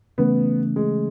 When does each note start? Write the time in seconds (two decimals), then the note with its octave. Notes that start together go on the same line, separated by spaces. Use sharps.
0.18 C#3 E3 A3 B3 C#4
0.76 G#3